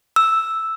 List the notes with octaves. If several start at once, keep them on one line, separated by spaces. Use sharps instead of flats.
E6